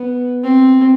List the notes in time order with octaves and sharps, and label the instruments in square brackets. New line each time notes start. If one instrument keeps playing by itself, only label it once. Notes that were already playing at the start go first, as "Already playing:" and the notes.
Already playing: [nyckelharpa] B3
C4